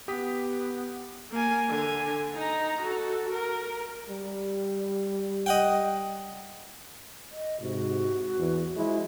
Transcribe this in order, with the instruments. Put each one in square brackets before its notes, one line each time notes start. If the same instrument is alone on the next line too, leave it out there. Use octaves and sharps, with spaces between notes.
[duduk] B3 [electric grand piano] G4 D#6 B6
[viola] A#3 G#5
D3 G#5
D#4 A#5
F#4 A4
A#4
[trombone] G3
[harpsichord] D#5 F#5 G5
[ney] D#5
[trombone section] G#2 C3 [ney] F#4
[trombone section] E2
F3 G#3 E4